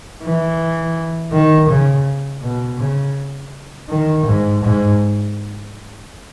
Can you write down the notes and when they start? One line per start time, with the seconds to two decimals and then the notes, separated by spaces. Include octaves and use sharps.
0.22 E3
1.32 D#3
1.69 C#3
2.42 B2
2.80 C#3
3.89 D#3
4.26 G#2
4.64 G#2